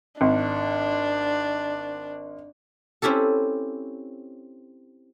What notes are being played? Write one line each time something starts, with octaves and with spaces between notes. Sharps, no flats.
G#1 D4
C4 C#4 E4 G4 A4